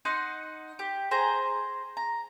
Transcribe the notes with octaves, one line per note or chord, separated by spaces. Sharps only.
D#4 D#5 F#5 C6
G4
G#4 C5 A#5
A#5